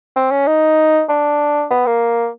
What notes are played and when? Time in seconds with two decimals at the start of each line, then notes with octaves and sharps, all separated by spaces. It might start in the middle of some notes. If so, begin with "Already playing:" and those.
0.16 C4
0.31 C#4
0.47 D#4
1.09 D4
1.71 B3
1.87 A#3